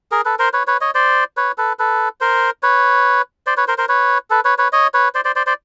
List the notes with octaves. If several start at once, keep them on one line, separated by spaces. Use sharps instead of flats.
G#4 A#4
A4 B4
A#4 C5
B4 C#5
B4 C#5
C#5 D#5
C5 D5
B4 C#5
A4 B4
A4 B4
A#4 C5
B4 C#5
C5 D5
B4 C#5
A#4 C5
A#4 C5
B4 C#5
A4 B4
B4 C#5
B4 C#5
C#5 D#5
B4 C#5
C5 D5
C5 D5
C5 D5
C5 D5